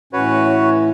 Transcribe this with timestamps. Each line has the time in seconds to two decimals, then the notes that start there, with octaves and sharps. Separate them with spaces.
0.13 A2 E3 C#4 F#4 B4 C#5